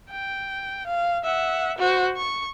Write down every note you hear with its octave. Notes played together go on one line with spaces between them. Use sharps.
G5
F5
E5 F#5
F#4 C5
C#6